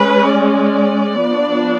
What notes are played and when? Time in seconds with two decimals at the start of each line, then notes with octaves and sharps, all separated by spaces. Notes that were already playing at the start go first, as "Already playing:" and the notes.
Already playing: G#3 C#4 B4
0.32 D5
1.24 F3 B3 D4